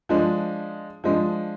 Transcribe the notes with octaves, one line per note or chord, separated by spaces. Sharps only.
F3 G#3 D4
F3 G#3 D4